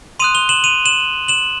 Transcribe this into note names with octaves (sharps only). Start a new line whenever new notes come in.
C6 D#6 F#6 D#7 F7
F7 G7
E7 F#7
D#7 F7
E7 F#7
E7 F#7